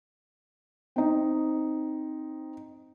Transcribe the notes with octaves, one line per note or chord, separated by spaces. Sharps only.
C4 D#4